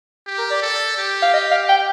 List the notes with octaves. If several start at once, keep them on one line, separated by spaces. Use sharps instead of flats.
G4
A#4
D5
A4
G4
F5
D#5
F5
G5